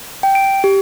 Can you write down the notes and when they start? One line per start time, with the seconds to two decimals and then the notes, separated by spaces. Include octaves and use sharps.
0.23 G5
0.35 D7
0.64 G4